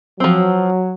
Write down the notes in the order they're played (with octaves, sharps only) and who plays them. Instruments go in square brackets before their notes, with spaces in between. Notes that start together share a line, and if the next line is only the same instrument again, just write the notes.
[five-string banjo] F3 C4 [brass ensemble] F#3